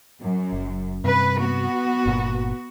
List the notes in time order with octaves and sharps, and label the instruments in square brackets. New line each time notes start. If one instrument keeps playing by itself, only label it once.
[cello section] F#2
[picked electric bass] F#1
[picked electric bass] G2 C3 [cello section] B4
[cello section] B3 F#4
[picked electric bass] G1 A#2